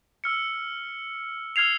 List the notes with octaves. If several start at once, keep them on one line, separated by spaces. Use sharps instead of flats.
E6 F6 C#7
E6 F6 G#6 C7 F7